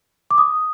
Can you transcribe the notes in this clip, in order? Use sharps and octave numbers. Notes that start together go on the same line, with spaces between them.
D6
D#6